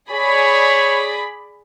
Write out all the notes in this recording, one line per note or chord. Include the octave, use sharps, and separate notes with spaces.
G#4 C#5 D5 B5